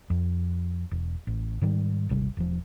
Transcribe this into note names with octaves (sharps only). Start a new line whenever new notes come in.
F2
E1
A1
G#2 D#3 G3
D#1 G#1 C3 G3
E1 F3